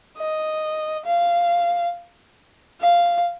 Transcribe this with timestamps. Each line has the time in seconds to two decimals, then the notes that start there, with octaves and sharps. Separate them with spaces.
0.18 D#5
1.05 F5
2.81 F5